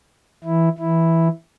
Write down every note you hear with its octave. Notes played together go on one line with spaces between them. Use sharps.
E3 E4
E3 E4